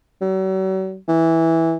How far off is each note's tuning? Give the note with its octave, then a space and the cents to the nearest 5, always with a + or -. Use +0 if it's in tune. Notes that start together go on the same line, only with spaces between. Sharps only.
F#3 +45
E3 -10